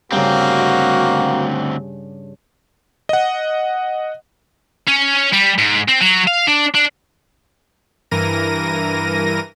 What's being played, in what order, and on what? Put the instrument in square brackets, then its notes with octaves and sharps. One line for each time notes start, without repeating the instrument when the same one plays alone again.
[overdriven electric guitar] D2 C4 [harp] G2 C#3 [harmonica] A#3 [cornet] F#4
[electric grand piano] D#5 F#5
[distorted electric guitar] C#4
G3
G#2
C4
F#3
F5
D4
D4
[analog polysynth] G2 E3 A#4 A#6 D#7